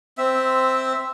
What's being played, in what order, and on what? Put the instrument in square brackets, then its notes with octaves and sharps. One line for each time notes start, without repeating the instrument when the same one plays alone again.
[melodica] C4 E5